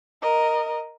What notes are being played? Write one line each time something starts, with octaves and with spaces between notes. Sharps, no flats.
A#4 D#5